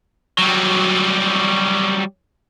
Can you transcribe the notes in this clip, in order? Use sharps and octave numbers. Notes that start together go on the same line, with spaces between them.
F#3 G3